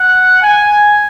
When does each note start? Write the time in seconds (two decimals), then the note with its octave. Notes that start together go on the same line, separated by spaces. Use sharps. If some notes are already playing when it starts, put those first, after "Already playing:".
Already playing: F#5
0.42 G#5